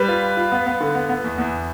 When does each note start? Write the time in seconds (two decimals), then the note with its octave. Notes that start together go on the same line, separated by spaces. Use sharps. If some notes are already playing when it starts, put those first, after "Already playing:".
Already playing: G3 B4
0.08 F4
0.23 F4
0.37 F4
0.52 B3
0.66 B3
0.81 D3
0.95 B3
1.09 B3
1.24 E2
1.38 E2